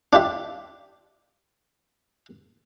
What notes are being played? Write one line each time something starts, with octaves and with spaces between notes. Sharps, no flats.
D4 F4 G4 E5